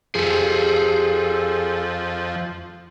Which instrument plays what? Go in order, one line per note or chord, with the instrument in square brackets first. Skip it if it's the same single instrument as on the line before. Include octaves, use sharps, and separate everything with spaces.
[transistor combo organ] F2 F3 [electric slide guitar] G#4 A4